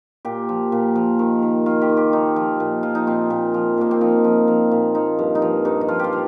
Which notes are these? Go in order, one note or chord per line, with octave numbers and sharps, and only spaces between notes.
A#2 G4
F3
A#2
F3
D#3
D#3
D#3 F4
G4
D#3
G4
F3 D#4
F3
A#2
F3 F4
D#4
A#2 C4
A#2
F3
A#2 A#3
C4
F3 D#4
F3
F3
A#2
F3 D#4
G2
D#4
F3 F4
G2 D#4
D#4
F3 F4
F4 G4
F3